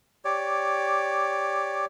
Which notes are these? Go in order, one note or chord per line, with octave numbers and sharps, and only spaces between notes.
G4 C#5 D5 D6